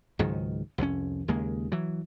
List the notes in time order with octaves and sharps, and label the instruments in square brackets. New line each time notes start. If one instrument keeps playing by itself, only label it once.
[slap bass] C#2 G#2 D#3 F#3
C2 F2 E3 C#4
D#2 C#3 G#3 A#3
E3 F#3